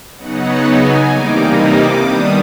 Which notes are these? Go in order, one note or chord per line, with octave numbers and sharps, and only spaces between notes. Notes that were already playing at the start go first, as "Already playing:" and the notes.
C#3 F#3 B3 D#4 F#5
G#5
C3 E3 G3 A#3 D#4 D6
D#6
D6
D#3 G3 B3 D4 D#6